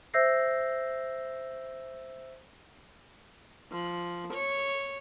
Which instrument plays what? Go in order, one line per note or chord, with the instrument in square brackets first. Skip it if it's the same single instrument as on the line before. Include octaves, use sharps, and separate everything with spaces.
[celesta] C5 E5 E6 G6 A#6 C7
[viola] F3
C#5